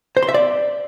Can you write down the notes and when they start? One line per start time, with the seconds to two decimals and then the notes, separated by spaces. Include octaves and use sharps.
0.17 C5
0.23 C6
0.29 E5
0.34 D5